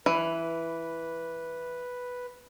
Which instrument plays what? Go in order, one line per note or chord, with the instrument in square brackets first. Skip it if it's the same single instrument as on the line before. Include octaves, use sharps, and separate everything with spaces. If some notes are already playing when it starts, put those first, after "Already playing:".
[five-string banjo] E3 [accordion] B4